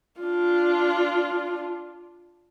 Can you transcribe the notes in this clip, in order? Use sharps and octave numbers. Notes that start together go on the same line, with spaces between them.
D4 F4